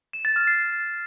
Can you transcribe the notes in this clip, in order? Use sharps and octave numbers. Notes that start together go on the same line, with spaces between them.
E7
A6
F6
C7